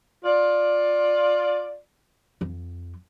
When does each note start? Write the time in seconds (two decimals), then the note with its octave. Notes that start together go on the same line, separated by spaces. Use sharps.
0.24 F4 D5
2.41 F2